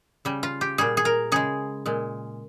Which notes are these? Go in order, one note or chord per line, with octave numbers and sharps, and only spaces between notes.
C#3 G3
F4
G4
A#2 G3 G#4
G#4
A#4
C#3 G#3 G#4
A#2 G#3